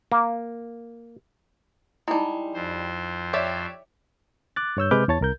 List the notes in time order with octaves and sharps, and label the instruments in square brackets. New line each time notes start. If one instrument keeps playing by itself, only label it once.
[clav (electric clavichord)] A#3
[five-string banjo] G3 G#3 [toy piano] D#4 E4
[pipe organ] F2 C5
[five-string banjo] G4 [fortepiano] C#5 D5 E5
[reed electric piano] D6 F#6 A6
G2 C#5 E6 G6
C3 G#3 B4 D6 F6 G6
E2 E3 C#5 A5 A6
C2 A#4 G6